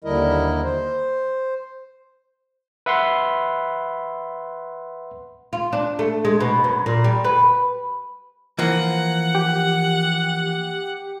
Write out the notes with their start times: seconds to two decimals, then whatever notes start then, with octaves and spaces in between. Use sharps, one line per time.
0.04 D#2 D3 G3 E4 A#4 D#5
0.63 C5
2.86 B4 E5 F#5 B5 C6
5.53 F4
5.73 D4
5.99 A3
6.25 G#3
6.40 B2
6.64 F#2
6.86 A#2
7.04 G3
7.24 B4
8.59 E3 F3 A#3 F#5
9.35 G4